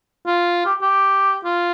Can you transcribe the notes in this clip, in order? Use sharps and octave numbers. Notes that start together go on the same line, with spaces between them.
F4
G4
G4
F4